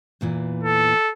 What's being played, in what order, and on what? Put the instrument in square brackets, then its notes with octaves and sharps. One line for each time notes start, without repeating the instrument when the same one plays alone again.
[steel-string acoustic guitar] E2 A#2 E3
[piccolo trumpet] A4